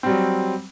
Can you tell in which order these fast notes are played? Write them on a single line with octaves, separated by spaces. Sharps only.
C4 G3 F#3